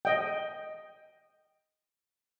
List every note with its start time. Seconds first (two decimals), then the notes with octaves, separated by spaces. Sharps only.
0.05 D#5 G5